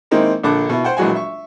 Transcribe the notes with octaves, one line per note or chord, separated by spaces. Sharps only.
D#3 G#3 A#3 C4 D#4 E4
A#1 D3 A4 D6 F#6
B2 E4
C5 F#5 G5
A#1 E3 F#3 G#3 F#4 G#5
E5 C#6